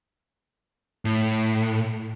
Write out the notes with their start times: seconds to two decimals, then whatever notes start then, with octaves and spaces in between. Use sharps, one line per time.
1.05 A2